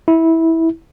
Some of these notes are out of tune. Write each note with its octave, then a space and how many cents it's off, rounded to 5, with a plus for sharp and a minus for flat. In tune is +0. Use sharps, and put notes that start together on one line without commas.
E4 -15